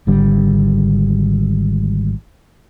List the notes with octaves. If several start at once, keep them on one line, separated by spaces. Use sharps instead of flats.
G#1 D3 G3